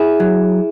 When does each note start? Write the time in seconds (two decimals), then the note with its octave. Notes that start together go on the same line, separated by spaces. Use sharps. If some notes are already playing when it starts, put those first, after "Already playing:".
Already playing: E4 G#4
0.20 F#3